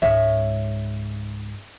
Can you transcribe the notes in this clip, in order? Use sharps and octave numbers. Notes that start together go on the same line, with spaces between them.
C#2 G#2 C#5 E5